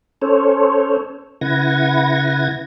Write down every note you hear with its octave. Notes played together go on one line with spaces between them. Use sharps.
C#4 A4 C5 C#5
C#3 E4 B4 F#5 G#6 A#6